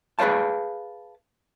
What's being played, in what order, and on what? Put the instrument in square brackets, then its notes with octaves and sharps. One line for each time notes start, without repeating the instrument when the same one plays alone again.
[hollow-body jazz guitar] G#4 B4 C5 D5 F5 A5